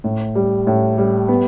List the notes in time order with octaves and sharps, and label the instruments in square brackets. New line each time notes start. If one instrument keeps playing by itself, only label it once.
[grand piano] A2
G3
A2
G3
B3